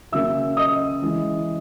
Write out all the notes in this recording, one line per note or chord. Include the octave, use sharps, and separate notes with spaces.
C#3 F#3 A#3 C#4 E5 E6
D#5 D#6
E3 G#3 C#4 E4